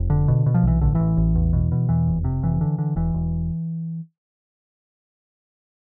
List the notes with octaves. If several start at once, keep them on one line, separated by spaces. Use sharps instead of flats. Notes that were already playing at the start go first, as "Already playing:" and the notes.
Already playing: F1
D3
B2
B2
F3
B1 E3
A1 D3
A1 E3
A1
E2
B2
B2
E2 E3
F1
C3
F1 E3
D3
D3
E1 E3
E1